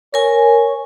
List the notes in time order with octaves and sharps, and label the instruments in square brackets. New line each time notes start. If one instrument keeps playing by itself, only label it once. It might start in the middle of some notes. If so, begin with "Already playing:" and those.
[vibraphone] A#4 G#5 [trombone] C#5